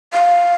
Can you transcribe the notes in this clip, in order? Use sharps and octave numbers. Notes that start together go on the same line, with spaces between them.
F5